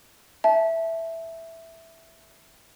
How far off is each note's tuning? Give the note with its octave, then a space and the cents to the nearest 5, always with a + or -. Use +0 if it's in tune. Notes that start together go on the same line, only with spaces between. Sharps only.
E5 +0 A5 -20